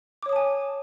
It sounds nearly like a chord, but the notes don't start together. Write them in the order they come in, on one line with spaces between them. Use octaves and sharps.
D6 C#5 D#6 A5 G#5